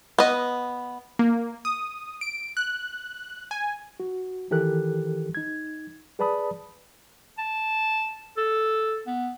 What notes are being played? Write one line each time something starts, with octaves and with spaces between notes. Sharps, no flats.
B3 D#5
A#3
D#6
D7
F#6
G#5
F#4
D#3 E3 G4 A4 A#4 F#6
D#4 G#6
G#4 B4 D5 A5 B5 D#6
A5
A4
B3